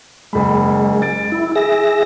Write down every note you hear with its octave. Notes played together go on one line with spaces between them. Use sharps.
F#1 G#3 B5
A6 D7
E4
G#4 E5 A#6